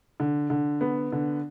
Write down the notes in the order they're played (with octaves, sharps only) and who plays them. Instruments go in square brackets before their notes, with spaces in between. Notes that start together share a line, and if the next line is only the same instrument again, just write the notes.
[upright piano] D3
D3
B3
D3